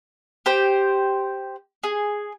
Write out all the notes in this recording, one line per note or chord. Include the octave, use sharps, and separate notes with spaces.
G4 C5 G5
G#4